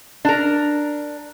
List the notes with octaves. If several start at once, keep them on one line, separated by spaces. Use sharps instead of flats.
D4 A#4